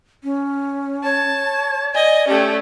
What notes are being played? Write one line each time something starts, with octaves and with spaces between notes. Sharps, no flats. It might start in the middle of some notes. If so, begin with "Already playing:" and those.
C#4
C#5 A5
D5 D#5 G#5
A3 C#4 G4